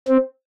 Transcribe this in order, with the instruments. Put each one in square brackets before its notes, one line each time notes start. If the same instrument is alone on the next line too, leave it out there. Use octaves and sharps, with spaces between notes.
[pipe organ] C4